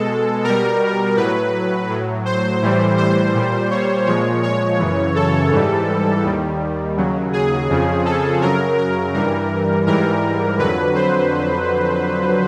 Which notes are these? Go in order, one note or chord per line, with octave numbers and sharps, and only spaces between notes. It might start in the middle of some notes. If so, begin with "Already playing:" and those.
Already playing: B2 G#3 A4
B2 G3 A#4
A2 F#3 B4
A2 F#3
C5
A2 E3 G3
C5
A#2 G3
C#5
A#2 F3 G#3 C#5
C#5
F#2 C#3 E3
A4
G#2 E3 G3
D#2 D#3 G3
D#2 C#3 F#3
G#4
F2 C#3 F3
A4
F#2 C#3 F#3 A#4
A#4
G2 E3 G3 A#4
G#2 E3 G3 A#4
F2 D3 F#3 B4
C5